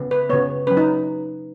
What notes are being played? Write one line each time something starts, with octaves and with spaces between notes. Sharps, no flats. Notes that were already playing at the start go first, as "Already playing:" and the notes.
Already playing: C#3 B3
B4
C#3 B3 C#5
F#3 C#4 B4
D#4